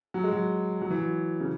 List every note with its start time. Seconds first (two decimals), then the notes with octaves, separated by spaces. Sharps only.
0.14 F#3
0.24 G#3
0.32 F#3
0.82 F#3
0.90 E3
0.99 F#3
1.40 C#3